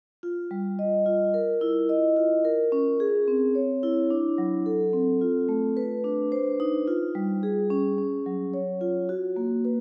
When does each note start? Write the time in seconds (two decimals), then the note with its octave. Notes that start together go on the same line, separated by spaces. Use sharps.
0.23 F4
0.51 G3
0.79 D#5
1.06 F4
1.34 A#4
1.61 E4
1.89 D#5
2.16 F4
2.45 A#4
2.72 C#4
3.00 G#4
3.28 C4
3.55 C#5
3.83 E4
4.10 D4
4.38 F#3
4.66 A4
4.93 C4
5.21 F4
5.49 A3
5.77 B4
6.04 D4
6.32 C5
6.60 D#4
6.88 F4
7.15 G3
7.43 G#4
7.70 C#4
7.98 C#4
8.26 F#3
8.54 C#5
8.81 F4
9.09 F#4
9.36 A#3
9.65 B4